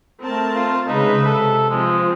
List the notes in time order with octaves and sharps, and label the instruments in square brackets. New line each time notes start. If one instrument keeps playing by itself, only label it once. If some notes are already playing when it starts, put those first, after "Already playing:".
[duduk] A3 [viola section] C4 A#4 A5
[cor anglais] F4
[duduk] C#3 [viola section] G#3 B4 E5 [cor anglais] D#4
[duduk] C3 [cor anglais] A4
[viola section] F3 C4 [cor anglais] G#3